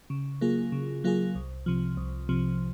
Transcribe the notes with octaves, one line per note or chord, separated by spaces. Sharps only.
C#3
F#3 A#3 F4 G#4
C#3
F#3 A#3 F4 G#4
C2
C3 F3
C2
C3 F3